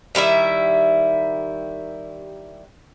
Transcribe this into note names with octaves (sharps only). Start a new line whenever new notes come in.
D#3 G3 E4 E5